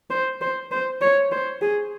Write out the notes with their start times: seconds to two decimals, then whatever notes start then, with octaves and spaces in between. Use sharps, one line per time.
0.10 C5
0.41 C5
0.71 C5
1.01 C#5
1.32 C5
1.62 G#4